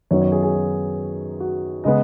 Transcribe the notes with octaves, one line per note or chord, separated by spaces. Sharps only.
F#2 D#3 F#3 B3 C#5
C#5
G#4
G#4
F#4
F#4
C#3 G#3 B3 D#5